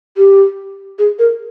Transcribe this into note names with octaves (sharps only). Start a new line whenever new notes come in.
G4
G#4
A#4